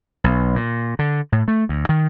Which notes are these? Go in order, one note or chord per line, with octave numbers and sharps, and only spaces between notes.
B1
A#2
D3
A2
A3
D2
D#3